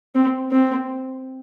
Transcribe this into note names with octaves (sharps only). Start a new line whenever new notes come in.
C4
C4